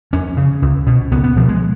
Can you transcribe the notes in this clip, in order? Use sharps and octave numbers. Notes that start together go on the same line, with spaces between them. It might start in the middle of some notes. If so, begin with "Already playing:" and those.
F2 C#4
C#3
C#2
B2
C#2 B3
B3
B2 F3
G#3